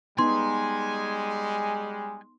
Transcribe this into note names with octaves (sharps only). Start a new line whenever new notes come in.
G3 G#3 B3 D#4 G#5 C6